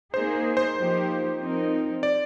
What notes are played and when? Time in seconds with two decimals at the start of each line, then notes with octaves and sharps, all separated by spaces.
0.14 A#3 D#4 G#4 C5
0.57 C5
0.78 F3 A#3 D#4 G4
1.40 F3 C4 D#4 A#4
2.03 D5